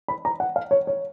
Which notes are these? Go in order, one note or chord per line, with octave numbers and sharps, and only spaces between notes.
B5
A#5
F#5
F5
C#5
C#5